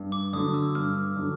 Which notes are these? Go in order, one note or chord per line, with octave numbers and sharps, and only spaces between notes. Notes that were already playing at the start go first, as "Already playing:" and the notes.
Already playing: G2
D6
D3 F#3 D#6
E6
G2 F6
D3 F#3